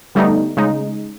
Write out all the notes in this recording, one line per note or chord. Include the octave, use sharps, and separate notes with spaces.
D3 G3 A3 B3 D#4
C#3 G#3 D#4